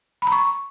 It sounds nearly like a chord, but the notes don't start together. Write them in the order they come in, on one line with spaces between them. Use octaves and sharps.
B5 A#5 C#6